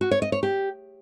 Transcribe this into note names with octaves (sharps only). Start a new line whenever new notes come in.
F#4
C#5
D#5
C#5
G4